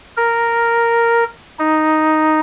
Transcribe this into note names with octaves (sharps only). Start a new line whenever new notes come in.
A#4
D#4